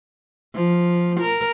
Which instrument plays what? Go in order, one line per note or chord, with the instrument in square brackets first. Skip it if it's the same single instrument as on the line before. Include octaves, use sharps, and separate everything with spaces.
[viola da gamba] F3
A#4